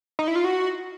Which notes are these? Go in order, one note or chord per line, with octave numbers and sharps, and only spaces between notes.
D#4
E4
F4
F#4